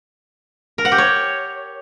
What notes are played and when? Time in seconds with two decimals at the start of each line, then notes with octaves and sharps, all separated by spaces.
0.78 A#4
0.85 F#5
0.92 G4
0.98 C#5